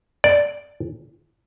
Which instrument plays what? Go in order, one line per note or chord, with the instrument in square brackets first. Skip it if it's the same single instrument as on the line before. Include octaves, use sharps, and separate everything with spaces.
[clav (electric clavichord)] D5